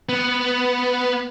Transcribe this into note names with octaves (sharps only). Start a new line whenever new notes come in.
B3